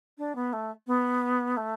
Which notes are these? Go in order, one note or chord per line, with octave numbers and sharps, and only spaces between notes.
D4
B3
A3
B3
A3